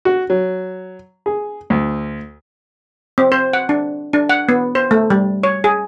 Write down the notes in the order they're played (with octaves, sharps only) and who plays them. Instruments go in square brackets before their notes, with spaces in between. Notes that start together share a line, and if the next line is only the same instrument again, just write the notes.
[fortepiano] F#4
F#3
G#4
D2
[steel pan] C4
C5
F#5
D4
D4
F#5
B3
C5
A3
G3
C#5
G#4